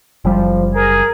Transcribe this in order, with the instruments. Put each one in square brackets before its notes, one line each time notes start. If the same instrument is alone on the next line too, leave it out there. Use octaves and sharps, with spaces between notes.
[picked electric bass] F#1 G3 [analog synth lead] F3
[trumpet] G#4 [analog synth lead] A#4